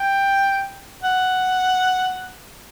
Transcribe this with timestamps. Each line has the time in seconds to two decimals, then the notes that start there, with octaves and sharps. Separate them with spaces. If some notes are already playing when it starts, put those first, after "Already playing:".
Already playing: G5
1.03 F#5